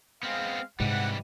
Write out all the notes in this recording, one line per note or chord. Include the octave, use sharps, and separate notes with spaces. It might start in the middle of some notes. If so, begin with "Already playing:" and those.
G#3 B3 C4 F5
G#2 C3 E3 G3 F#5 D#7